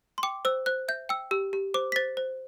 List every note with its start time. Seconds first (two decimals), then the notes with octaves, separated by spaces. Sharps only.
0.18 C6
0.23 G5 D6
0.45 C5 E6
0.66 C5 F#6
0.88 E5 G6
1.09 G5 E6
1.31 G4 E6
1.53 G4
1.74 C5 D6
1.92 B6
1.96 C5 A6
2.17 C5